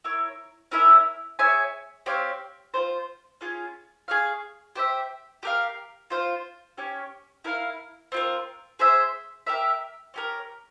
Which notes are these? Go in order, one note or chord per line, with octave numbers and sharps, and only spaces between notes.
E4 A#4 C#5
C#4 E4 A#4 E5
G#4 C#5 E5 G#5
C4 G4 C#5 F5
F4 G#4 C5
C#4 F4 G#4
G#4 C#5 F5
G4 C5 E5
G4 A#4 F5
F4 C5 F5
C#4 G4 C#5
E4 A#4 F5
C4 F4 A#4
G#4 C5 E5
G4 A#4 E5
C#4 G4 A#4